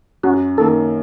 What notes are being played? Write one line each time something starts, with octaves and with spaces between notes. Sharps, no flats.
F#2 F#4
D#3 A#3 A4